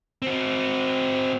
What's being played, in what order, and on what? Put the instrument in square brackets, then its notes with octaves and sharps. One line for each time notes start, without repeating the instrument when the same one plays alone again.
[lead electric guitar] C4 F#4